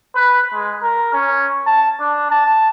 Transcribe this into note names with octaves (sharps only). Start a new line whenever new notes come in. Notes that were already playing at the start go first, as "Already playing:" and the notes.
B4
G#3
A#4
C#4
A5
D4
A5